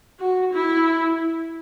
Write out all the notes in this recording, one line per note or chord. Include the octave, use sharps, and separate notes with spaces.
F#4
E4